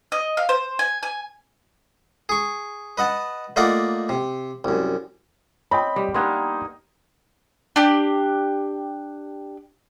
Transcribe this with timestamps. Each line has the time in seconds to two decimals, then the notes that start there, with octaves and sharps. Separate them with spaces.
0.12 D#5
0.37 F5
0.49 C5
0.79 G#5
1.03 G#5
2.29 G#4 C#6
2.97 B4 D#5 F#5 A5
3.56 A3 A#3 F4 D5 D#5 F#5
4.09 C3
4.64 C2 F#2
5.71 C4 C#5 D#5 G5 B5 D#6
5.96 G3
6.14 G3 A#3 B3 D4 D#4 A#4 C6 G#6
7.76 D4 G4